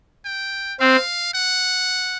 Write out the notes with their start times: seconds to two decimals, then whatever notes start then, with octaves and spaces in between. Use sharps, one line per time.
0.25 G5
0.80 C4 F5
1.34 F#5